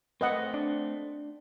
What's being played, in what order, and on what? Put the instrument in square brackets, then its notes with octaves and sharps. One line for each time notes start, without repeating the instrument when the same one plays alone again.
[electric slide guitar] A3 C4 [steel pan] B4 D#5 F#5
[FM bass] D4